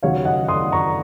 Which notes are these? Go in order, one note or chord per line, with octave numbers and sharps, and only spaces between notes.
D#2 C#3 F#3 C#5 F5
D#5 F#5
C6 D#6
A#5 C#6